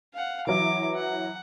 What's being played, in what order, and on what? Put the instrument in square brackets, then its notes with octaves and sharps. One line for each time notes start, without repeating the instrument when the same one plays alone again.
[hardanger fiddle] F5 F#5
[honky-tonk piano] E3 F#3 E4 [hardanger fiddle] D6
[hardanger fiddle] F#5